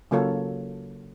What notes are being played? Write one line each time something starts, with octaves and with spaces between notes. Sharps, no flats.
C#3 F#3 A#3 F4 A4 C#5